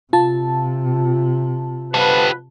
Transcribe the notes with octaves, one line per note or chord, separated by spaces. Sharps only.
C3 F4 A5
B2 F3 G4 A4 B4